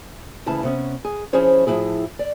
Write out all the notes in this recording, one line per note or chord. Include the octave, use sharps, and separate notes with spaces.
D2 C#3 E3 E4 A5
C3 B3 C#4
G#4
F3 C#4 E4 G#4 C5 C#5
A2 F3 D4 E4 G#4
D5